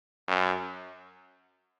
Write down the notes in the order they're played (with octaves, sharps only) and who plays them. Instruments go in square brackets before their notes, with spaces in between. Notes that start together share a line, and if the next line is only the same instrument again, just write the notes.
[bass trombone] F#2